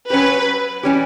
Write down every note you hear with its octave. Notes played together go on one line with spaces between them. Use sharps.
F#3 C#4 G4 B4
E3 G3 C#4 G4